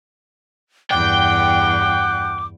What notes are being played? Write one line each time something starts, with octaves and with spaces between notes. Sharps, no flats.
E2 G2 F#5 G5 D6